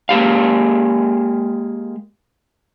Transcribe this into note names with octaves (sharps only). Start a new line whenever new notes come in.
G#3 A#3 G4 F5